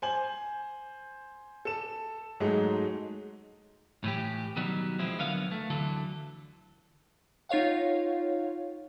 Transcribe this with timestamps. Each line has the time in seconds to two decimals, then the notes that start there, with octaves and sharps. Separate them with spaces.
0.02 C5 G#5 F#7
1.65 A4 E7
2.40 G#2 F#3 G#3 A3 D#4 G#4
4.04 A2 E3 G4
4.57 B2 D#3 F#3 G3
4.99 F3 G#3 C4 E4
5.18 C2 D3 F#3 B3 A#4 F5
5.51 A3
5.70 D2 D3 E3 F#3 A4
7.49 D#4 F4 C#5 F5 F#5